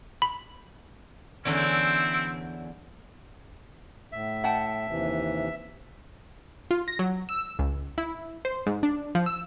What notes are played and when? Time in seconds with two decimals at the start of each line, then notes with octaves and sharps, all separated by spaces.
0.22 B5
1.45 E2 D3 C4 C#4 E4
4.12 A2 E5
4.44 F#5 G5 A5
4.88 D#2 C3 E3
6.71 F4
6.88 A#6
6.99 F#3
7.29 E6
7.59 C#2
7.98 E4
8.45 C5
8.67 G#2
8.83 D4
9.15 F3
9.26 E6